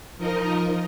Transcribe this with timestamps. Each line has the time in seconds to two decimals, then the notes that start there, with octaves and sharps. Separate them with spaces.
0.18 F3 D#4 A#4 D#5